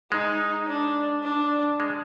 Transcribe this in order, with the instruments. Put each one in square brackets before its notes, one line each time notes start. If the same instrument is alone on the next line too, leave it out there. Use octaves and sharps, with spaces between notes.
[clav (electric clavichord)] G#3 [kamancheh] D#4
[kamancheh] D4
D4
[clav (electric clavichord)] G#3